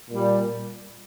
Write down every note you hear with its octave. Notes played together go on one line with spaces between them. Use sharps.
A#2 G3